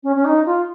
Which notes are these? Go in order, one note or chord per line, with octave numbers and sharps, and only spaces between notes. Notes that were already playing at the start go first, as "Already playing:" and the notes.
C#4
C#4
D#4
F4